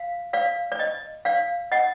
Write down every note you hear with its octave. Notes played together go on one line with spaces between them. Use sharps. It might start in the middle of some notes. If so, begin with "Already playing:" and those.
Already playing: F5
D5 F5
D5
D#5
D5 F5
D#5 F#5